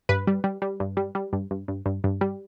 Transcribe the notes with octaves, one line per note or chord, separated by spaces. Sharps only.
G2 B4
G3
G3
G3
G2
G3
G3
G2
G2
G2
G2
G2
G3